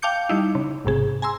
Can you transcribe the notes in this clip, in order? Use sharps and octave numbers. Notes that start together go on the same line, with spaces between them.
F5 G5 A5 D6 G6 C#7
G3 D#4 E4
C#3
A1 G#2 C3 G#4
G#5 A#5 C6 E6